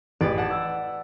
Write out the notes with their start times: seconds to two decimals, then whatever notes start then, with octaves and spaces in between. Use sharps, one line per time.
0.21 A1 G#4 B4 D5
0.38 F#5 A5
0.51 E6